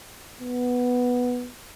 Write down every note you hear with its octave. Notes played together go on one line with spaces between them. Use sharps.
B3